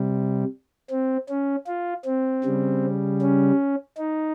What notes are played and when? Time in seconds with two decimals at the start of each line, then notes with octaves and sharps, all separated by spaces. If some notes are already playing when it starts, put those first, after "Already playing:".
Already playing: C3 G3
0.90 C4
1.29 C#4
1.67 F4
2.05 C4
2.44 C#3 G3
3.21 C#4
3.97 D#4